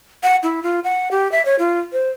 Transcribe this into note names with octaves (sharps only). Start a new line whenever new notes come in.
F#5
E4
F4
F#5
G4
E5
C#5
F4
C5